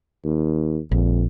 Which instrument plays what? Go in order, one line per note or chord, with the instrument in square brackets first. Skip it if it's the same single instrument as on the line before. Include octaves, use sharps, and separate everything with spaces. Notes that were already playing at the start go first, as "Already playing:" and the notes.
[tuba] D#2
[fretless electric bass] A#1 [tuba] F2